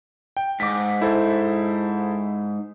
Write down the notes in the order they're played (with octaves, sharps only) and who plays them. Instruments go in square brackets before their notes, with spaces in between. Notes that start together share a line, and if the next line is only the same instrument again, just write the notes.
[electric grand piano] G5
[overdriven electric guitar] G#2 [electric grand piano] D6 B6
[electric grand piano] E4 A4 C5